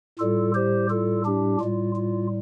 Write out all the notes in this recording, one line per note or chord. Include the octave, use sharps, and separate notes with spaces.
A2 G3 F4 A4
G4 C5
F4 A4
D4 G4
A2 G3 F4
F4